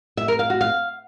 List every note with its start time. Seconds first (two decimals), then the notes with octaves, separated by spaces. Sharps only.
0.17 E5
0.28 A#4
0.39 F5
0.50 F#4
0.61 F5